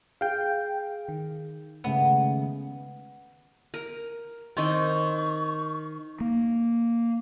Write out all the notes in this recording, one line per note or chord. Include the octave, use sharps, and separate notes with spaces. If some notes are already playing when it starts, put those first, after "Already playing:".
G#4 F5 G5
D#3
C#3 G#3 A3 B3
A#4
D#3 C4 C#6
A#3